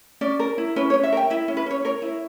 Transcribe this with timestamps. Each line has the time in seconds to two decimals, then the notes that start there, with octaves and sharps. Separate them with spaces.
0.21 C#4 D5
0.39 A#4
0.58 E4
0.76 C#4 B4
0.90 C#5
0.94 C#4
1.03 E5
1.12 A#4 G5
1.30 E4 E5
1.48 C#4
1.57 B4
1.66 C#4 C#5
1.85 A#4 C#5
2.02 E4